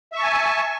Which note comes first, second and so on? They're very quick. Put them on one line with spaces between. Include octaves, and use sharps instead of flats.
E5 C#6 A5 G#5